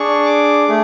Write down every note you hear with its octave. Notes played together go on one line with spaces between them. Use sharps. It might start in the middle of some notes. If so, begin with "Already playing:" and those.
Already playing: D4 G#4 C#6
D6
A3 G#4